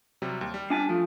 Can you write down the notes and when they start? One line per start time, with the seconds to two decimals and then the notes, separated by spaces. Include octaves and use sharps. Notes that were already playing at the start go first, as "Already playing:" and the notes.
0.22 C3 F#3 G3
0.41 D#2
0.54 G3
0.70 D4 G#5 A5
0.89 F3 A3